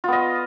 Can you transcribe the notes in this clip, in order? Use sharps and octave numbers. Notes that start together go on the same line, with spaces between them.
B3 F4 D#5